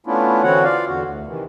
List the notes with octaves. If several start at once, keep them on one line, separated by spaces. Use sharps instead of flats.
A3 B3 C#4 D4 E4 F4
D3 E3 C4 F#4 C#5 F#5
F4 D5 F5
E2 D3 F#4
D2
C3 D#3 E3